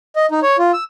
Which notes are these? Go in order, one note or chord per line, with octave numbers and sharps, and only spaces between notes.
D#5
D#4
C#5
F4
E6